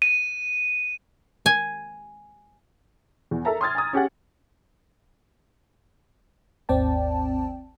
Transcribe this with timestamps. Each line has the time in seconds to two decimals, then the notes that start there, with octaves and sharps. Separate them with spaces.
0.02 D#7
1.46 G#5
3.31 E2
3.45 A4 A#4 E5 A5 A#5
3.61 C6 D#6 F6 G#6 A6
3.75 G#5 A#5 D#6
3.93 C#4 G4 G#4 F#5
6.69 G#1 D#2 C4 D5 G5 A5